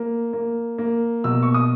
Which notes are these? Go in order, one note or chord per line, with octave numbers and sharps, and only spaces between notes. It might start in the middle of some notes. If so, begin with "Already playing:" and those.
Already playing: A#3
A#3
A#3
B2 E6
C#6
D#6